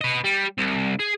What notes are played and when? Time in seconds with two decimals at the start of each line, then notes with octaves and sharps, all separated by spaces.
0.01 B4 D#5
0.24 G3
0.58 C2
0.99 G#4